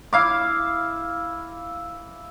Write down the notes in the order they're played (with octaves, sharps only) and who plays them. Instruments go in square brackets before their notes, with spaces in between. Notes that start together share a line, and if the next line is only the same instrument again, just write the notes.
[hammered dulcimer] E4 F5 D6